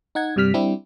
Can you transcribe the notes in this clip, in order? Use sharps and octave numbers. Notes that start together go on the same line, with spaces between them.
D#4 F#5 G#6
G2 C3 G3 F6 B6
G3 C4 D4 E4 G4